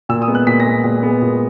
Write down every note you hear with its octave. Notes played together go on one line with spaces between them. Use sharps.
A#2 E6
D#6
G#3 B3
F#6
A#2 B6
A#6
G#3 B3
A#2
G#3 B3
A#2